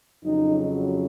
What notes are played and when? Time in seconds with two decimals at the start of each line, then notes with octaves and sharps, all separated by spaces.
0.25 F2 C#3 F#3 D#4